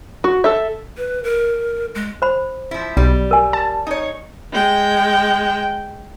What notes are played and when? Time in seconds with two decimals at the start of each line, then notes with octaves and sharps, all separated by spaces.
0.24 F#4
0.44 A4 E5
0.97 B4
1.24 A#4
1.95 G#3
2.22 C5 B5
2.71 F3 E4
2.97 B1 G3
3.31 A#4 G#5
3.53 A5
3.87 D#4 C#5
4.52 G#3 G5